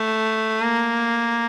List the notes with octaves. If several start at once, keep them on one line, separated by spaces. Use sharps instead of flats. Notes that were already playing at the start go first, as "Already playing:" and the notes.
Already playing: A3
A#3